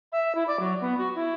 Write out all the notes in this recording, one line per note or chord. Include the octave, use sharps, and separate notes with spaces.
E5
E4
D5
F#3
B3
F#4
E4